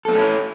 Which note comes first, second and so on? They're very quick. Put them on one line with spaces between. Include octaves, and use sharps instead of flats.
A4 C4 A3 C#4 E4